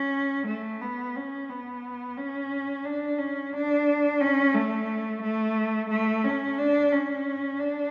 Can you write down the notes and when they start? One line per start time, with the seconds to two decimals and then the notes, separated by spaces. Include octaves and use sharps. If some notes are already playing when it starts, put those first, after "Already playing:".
Already playing: C#4
0.47 A3
0.82 B3
1.16 C#4
1.49 B3
2.17 C#4
2.85 D4
3.18 C#4
3.53 D4
4.20 C#4
4.54 A3
5.22 A3
5.90 A3
6.24 C#4
6.58 D4
6.92 C#4
7.60 D4